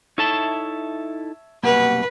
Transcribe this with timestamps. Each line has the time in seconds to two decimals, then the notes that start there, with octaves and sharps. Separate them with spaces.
0.18 D#4 E4 A4 C#5 E5 A5
1.63 C2 F#2 B2 A#3 G4 B4 F#5